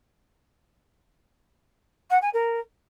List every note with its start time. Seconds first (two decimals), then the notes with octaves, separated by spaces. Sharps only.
2.10 F#5
2.22 G#5
2.33 A#4